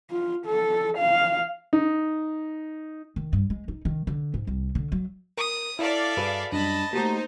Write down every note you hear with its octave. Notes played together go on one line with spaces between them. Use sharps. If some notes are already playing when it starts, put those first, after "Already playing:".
F4
A4
F5
D#4
D#3
G2
G#3
D#4
D#3
D3
G#2
C2
D3
F#3
A#4 D#6
E4 A4 D5 E5 F5
G2 F#4 G#4 B4
F#2 G3 D4 D#5 A5 B5
A3 A#3 D#4 F#4 G4 C5